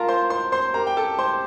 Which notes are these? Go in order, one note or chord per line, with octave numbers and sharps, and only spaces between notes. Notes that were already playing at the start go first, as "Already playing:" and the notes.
Already playing: F4 A#4 A5 A#5
C5 C6
C5 C6
C5 C6
G4 A#4 A#5
G5
A4 A5
C5 C6